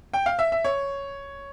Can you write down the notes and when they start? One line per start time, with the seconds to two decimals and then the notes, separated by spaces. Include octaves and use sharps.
0.14 G5
0.26 F5
0.39 E5
0.52 E5
0.64 C#5